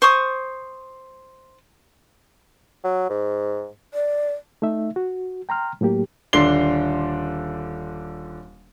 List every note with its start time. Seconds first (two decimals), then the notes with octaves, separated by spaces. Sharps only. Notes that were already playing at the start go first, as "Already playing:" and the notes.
0.02 C5 C#6 D#6
2.84 F#3
3.10 G#2
3.94 D5
4.62 A3 D#4 E5
4.96 F#4
5.49 G5 A#5 C6 F6
5.81 A2 F#3 A#3 G4
6.33 D#1 D3 D4 C6 C7 G7